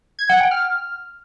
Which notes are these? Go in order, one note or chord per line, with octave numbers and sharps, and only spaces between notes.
G#6
F#5
G5
F6